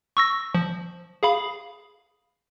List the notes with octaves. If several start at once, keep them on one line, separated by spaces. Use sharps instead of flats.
C#6 E6 A#6
F3
G#4 F5 B5